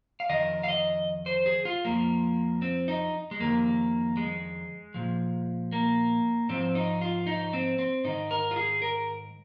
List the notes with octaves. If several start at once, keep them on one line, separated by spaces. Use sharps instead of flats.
F5
F2 D#3 D#5
F5
D#5
C5
G#4
F4
F2 F3 A#3
C4
D#4
G#3
F2 D#3 A#3
G#3
A#2 F3
A#3
G#2 F3 C4
D#4
F4
D#4
C4
C4
G#2 D#3 D#4
A#4
F4
G#4
A#4